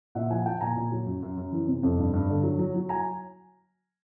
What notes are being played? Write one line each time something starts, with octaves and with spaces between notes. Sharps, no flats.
A#2 E5 F#5
F3 F#5 G#5
F3 G5 A5
A#2 G#5 A#5
A#2
F#3
F#2
F#2
F#2
E3
C3
F2
G2
G2
D3
F#3
F#3
F#3
G#5 A#5